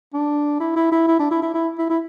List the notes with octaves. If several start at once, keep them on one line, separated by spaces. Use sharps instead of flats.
D4
E4
E4
E4
E4
D4
E4
E4
E4
E4
E4